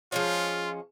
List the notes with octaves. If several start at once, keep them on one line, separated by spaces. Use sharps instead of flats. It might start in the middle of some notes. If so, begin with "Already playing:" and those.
F3 G#3 C#4 F4